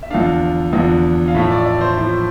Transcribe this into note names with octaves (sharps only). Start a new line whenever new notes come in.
E5
E2 D3 F3 B3 D4 F5
E2 D3 F3 B3 D4
F5
A2 F3 A3 E4 E5
D5
D5
C5
A2 F3 A3 E4